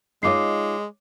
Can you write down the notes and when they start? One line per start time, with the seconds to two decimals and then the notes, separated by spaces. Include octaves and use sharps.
0.23 G#3 D#4 F4 C#5 D#5 D6 C7